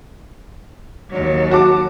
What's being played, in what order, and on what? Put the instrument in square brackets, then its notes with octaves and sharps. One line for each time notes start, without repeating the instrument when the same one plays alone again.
[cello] D#2 F#3
[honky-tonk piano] F#4 A5 D6